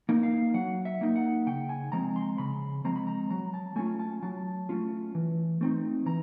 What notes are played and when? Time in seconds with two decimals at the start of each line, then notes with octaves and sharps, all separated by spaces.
0.09 A#3 D#4
0.23 F5
0.54 F#3 F#5
0.85 E5
1.01 A#3 D#4
1.16 F#5
1.47 C#3 G5
1.69 G#5
1.92 F3 G#3 C4 A#5
2.16 C6
2.38 C#3 B5
2.84 F3 G#3 C4 A#5
2.96 B5
3.07 A#5
3.30 F#3 A#5
3.54 A5
3.76 A3 C#4 F4 G#5
3.99 A5
4.22 F#3 A5
4.69 A3 C#4 F4
5.15 E3
5.61 A3 C4 D#4
6.06 E3 A#5